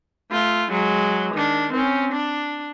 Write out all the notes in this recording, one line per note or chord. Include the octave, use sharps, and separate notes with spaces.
A3 F4
F#3 G#3
D#3 D4
C4 C#4
D4